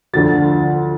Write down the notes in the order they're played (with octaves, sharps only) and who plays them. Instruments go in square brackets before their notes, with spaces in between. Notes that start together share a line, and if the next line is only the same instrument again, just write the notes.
[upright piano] D2 D3 F3 A6